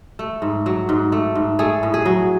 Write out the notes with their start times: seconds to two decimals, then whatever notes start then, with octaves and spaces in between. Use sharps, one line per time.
0.19 A3
0.42 G#2
0.66 F#3
0.89 G#2
1.12 A3
1.35 G#2
1.59 A3 G#4
1.83 A2
1.94 G#4
2.05 F#3